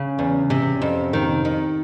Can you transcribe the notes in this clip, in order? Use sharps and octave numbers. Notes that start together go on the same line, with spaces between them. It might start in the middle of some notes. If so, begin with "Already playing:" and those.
Already playing: C#3 C#4
E2
C3
F2
D#3
D#3